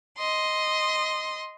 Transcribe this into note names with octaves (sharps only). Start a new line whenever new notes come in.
D#5 C6